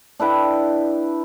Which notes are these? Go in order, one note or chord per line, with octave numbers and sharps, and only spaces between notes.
D4 E4 B4 G5